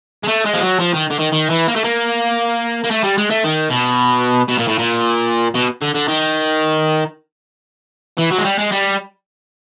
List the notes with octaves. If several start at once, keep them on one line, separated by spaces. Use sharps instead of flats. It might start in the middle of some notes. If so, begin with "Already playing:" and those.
G#3
A3
G#3
F3
F#3
F3
D#3
D3
D#3
D#3
E3
A#3
A3
A#3
A#3
A3
G3
G#3
A3
D#3
B2
B2
A#2
A2
A#2
B2
D3
D3
D#3
E3
F#3
G#3
G3
G#3
G3